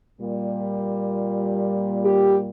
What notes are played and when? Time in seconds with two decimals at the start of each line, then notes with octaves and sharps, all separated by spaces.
0.20 A#2 G3
2.05 G4